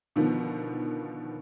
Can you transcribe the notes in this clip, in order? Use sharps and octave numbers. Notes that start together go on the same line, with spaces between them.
B2 D3 D#3 F3 B3